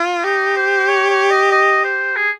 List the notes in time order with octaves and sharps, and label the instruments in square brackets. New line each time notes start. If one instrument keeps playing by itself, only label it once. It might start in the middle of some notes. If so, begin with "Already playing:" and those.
Already playing: [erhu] F4
[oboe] D#4 [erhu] G4
[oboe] C5
C#5
C#5
D#5
D#5
C5
G#4